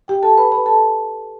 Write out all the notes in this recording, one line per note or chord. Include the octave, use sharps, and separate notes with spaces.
G4 G5
A4 A5
B4 B5
B4 B5
A4 A5